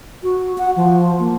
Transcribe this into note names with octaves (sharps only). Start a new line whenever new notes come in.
F#4
F#5
F3
A#3